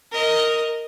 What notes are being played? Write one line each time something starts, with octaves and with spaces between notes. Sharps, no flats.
A#4 D#5